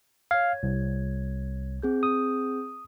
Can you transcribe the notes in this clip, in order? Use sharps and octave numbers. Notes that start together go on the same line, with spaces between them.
C#5 F5 G#6
C2
C4 G#4 G6
D#6